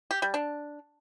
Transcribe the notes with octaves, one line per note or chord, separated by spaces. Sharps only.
G4
G3
D4